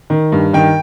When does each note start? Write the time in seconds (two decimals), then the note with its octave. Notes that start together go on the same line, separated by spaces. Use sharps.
0.10 D#3
0.32 G2
0.53 D#3 G5